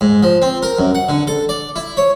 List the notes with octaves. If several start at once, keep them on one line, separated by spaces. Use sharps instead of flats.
G#2
F3
C4
A#4
F#2
F#5
D3
A4
D5
E4
C#5